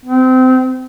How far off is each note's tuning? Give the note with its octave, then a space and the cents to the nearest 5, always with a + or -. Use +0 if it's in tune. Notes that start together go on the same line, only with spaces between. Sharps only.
C4 -25